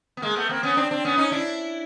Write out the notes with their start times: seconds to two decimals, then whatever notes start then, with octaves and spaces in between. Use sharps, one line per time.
0.17 B3
0.22 G#3 A#3
0.36 A3 B3
0.49 A#3 C4
0.63 B3 C#4
0.77 C4 D4
0.91 C4 D4
1.05 B3 C#4
1.18 C#4 D#4
1.32 D4 E4